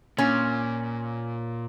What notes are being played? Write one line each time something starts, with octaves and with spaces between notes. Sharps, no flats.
A#2 C#4